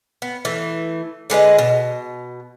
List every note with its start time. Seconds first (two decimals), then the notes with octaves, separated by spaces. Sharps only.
0.22 B3
0.45 E3 A3
1.30 D3 G#3 B4 D#5
1.58 B2